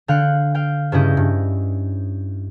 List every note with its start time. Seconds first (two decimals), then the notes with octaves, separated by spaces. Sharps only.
0.08 D3 F5 G5 F#6 C#7
0.55 F5 G5
0.92 G2 C#3 C#4 E4 D#5 G6
1.17 G2